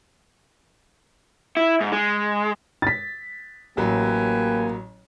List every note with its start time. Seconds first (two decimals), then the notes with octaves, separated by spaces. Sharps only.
1.57 E4
1.81 G#2
1.93 G#3
2.82 A6 B6
3.77 A1 F#3 A#3 G4 B4 G#5